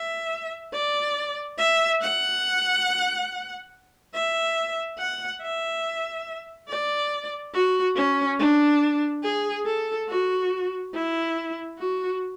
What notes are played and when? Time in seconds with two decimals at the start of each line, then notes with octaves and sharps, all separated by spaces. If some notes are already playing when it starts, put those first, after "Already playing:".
Already playing: E5
0.73 D5
1.58 E5
2.01 F#5
4.14 E5
4.98 F#5
5.41 E5
6.68 D5
7.53 F#4
7.96 C#4
8.39 D4
9.23 G#4
9.66 A4
10.08 F#4
10.94 E4
11.78 F#4